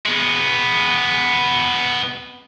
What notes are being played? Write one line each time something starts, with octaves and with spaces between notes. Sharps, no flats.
G#3 B3